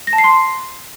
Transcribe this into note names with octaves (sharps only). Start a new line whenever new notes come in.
A#6
A5
C7
C6